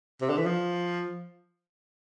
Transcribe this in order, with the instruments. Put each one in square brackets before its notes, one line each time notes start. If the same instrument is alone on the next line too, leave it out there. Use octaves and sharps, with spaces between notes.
[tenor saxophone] C3
D3
E3
F3